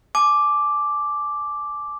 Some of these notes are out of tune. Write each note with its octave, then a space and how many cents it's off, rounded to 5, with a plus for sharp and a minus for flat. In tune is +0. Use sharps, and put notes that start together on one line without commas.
G#5 +40 D6 +0